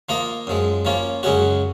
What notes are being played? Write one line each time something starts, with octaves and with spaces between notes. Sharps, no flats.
F3 A#3 F4 A#4 D#5
F#2 F3 G#3
F3 A#3 C#4 F4
F#2 C#3 G#3 C#4 F#4